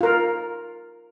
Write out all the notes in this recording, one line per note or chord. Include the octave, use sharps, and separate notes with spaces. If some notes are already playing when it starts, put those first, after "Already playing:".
F4 A#4